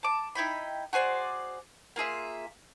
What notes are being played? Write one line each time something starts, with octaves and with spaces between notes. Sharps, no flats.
A5 D6
D#4 E4 G5 B5
F#4 G#4 C5 D5
A#3 F4 G#4 E5